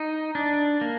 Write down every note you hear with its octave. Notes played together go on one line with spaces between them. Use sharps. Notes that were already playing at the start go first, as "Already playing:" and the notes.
Already playing: D#4
D4
A#3